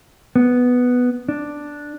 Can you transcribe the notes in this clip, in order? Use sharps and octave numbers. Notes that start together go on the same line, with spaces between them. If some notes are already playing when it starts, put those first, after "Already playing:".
B3
D4